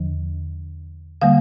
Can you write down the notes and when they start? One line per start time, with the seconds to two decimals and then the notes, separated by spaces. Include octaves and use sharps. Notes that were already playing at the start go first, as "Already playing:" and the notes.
Already playing: E2 D3 F3
1.22 D3 G3 A#3 F5